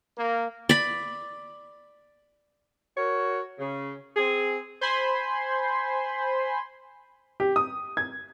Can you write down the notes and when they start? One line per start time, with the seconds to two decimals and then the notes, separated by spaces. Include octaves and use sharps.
0.18 A#3
0.69 D5 B5
2.96 F#4 A#4 C#5
3.58 C#3
4.15 C4 G#4
4.81 C5 G#5 B5 C6
7.40 G4
7.56 D#6
7.97 G#6